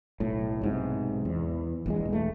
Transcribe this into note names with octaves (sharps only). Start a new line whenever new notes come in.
B1 A2
B1 G#2 C3
E2
A#1 E2 G#3
E1 A3